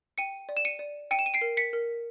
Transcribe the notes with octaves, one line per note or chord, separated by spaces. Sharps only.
G5 C#7 D#7
D5
E7
C#7 D#7
D5
G5 C#7 D#7
E7
D#7
C7 D7
A#4
B6 C#7
A#4